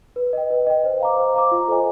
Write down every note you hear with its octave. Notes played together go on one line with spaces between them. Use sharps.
B4
D#5 G5
B4
D#5 G5
C5
F5 A#5 D6
C5
F5 A#5 D6
F4
A4 C5 D#5 G#5